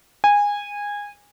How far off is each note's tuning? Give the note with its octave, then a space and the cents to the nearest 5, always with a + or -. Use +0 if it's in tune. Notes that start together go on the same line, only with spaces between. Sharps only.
G#5 -20